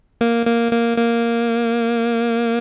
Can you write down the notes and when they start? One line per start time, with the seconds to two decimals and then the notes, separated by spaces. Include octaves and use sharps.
0.21 A#3
0.46 A#3
0.72 A#3
0.98 A#3